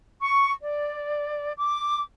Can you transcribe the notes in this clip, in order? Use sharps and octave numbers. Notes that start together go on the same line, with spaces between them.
C#6
D5
D6